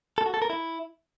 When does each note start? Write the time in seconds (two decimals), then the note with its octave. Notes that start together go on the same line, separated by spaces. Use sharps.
0.18 A4
0.26 F#4
0.34 A4
0.42 A#4
0.50 E4